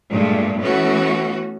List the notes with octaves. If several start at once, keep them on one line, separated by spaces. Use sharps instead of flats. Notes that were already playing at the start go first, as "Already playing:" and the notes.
G2 A#2 G#3 A3
E3 A3 B3 C#4 F#4